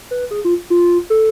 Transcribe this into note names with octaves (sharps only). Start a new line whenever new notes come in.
B4
G#4
F4
F4
A4